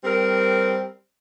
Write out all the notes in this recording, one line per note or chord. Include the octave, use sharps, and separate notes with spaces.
G3 C4 A#4